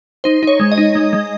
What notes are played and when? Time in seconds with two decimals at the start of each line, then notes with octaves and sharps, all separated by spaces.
0.24 D#4 C5
0.43 D#4 C#5
0.60 G#3
0.72 D#5
0.78 D#4
0.95 G#3
1.13 G#3